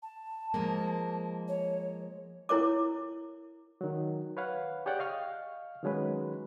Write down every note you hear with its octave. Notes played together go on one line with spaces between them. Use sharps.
A5
F3 G#3 A#3
C#5
E4 A#4 C#5 D6
D#3 F#3
B4 C#5 F5 F#5
G4 G#4 C#5 D5 F#5 G5
D#5 F5 C#6 F6
D#3 F#3 G#3 C#4 B4